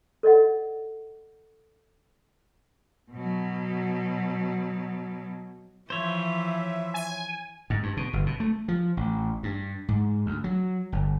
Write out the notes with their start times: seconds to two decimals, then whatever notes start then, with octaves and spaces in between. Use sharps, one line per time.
0.23 A4 D5 D#5 F#5
3.12 B2 F#3
5.90 E3 F3 C5 C#5 E5
6.94 G#5
7.70 G#2
7.83 G2
7.97 B2
8.13 G1
8.26 B2
8.40 A3
8.68 F3
8.97 A1
9.43 G2
9.88 G#2
10.26 D2
10.44 F#3
10.92 G1